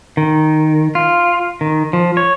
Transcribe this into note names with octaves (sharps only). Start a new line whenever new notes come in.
D#3
F4
D#3
F3
C#5